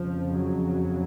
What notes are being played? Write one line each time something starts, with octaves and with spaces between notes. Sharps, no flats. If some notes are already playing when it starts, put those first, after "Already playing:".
Already playing: F2 C#3 F3
F#3